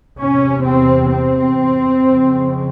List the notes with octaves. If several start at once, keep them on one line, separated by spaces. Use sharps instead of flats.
E2 C3 C#4
C4
C4
F2 C#3